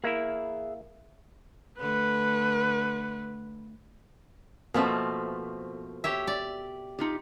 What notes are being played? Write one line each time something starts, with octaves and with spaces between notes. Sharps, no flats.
A#3 E4 G#4 E5
D3 A3 B4
B2 F3 A3 A#3 C4 B4
G4 C#5 E5
D5
D#4 F4 G4